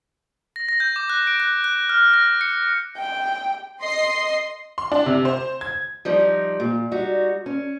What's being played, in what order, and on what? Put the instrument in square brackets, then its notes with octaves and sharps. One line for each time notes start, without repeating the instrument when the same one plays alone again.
[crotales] A#6
A#6
G6
D6
F#6
D7
F#6
F#6
F6
A#6
C#7
[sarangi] G5
[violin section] D#5 C6 C7
[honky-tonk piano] C6
D4
C3
C5
G#6
[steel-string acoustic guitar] F3 G3 D#4
A#2
G3 D#4 F#4
C#4